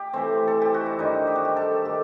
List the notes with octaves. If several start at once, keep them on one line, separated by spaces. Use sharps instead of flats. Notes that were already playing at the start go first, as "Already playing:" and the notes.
Already playing: G4
C3 E3 A3 C4
A4
G4
F#4
E4
G2 D#3 G3 D#4
G4
F#4
G4
A4
D#3 A3 G4